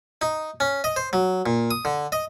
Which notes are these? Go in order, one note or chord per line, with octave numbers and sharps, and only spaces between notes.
D#4
C#4
D#5
C5
F#3
A#2
D#6
D3
D#5